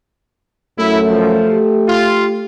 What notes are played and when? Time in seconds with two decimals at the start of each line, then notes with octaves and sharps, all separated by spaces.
0.79 F#2 A3 E4
1.08 F3
1.48 G4
1.88 F4